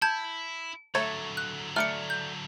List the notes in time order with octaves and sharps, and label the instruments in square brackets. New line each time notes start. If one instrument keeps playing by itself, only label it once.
[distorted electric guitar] E4 [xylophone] A5 G6 G#6
[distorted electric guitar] D3 F#3 [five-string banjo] A3 A4 C#5
[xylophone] F#6
[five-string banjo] A3 D5 [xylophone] F6 C#7
[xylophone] G6